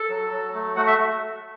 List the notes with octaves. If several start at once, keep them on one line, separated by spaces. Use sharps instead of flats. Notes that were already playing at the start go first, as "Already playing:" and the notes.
Already playing: A4 A5
F#3
F#3
A3
A3 F#4 F#5
E5